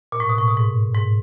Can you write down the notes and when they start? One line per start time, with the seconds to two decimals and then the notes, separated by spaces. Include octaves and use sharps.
0.12 A#2
0.20 A2
0.29 B2
0.38 A2
0.48 B2
0.57 G#2
0.95 G#2